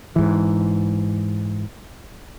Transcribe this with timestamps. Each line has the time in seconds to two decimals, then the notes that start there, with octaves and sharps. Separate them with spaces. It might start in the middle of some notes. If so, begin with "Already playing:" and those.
0.16 G#2 E3